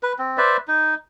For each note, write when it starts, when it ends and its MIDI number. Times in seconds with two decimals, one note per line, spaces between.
0.03 0.13 71
0.19 0.38 60
0.38 0.57 71
0.38 0.57 72
0.38 0.57 74
0.38 0.57 76
0.68 0.95 63